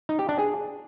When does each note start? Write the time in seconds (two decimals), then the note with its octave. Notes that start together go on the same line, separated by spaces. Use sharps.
0.09 D#4
0.19 G4
0.29 D4
0.39 G#4